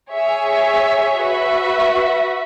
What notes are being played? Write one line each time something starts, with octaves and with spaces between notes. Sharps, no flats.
G#4 C#5 E5
F#4 B4 E5